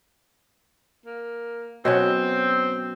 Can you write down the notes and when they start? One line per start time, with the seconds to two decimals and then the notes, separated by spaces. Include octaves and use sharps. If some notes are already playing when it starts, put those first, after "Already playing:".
1.06 A#3
1.85 B2 F#3 C4 C#4